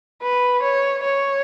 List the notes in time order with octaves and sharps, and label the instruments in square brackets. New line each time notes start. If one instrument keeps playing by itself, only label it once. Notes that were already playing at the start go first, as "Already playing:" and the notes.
[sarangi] B4
C#5
C#5